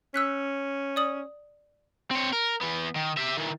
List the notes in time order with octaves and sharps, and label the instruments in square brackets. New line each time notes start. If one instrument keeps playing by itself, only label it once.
[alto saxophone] C#4 [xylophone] E6 F#6 B6
[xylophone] D5 D#6 F#7
[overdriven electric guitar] C4 C#5
A#4
E3 B3
D#3
G4 E5
D#3 E3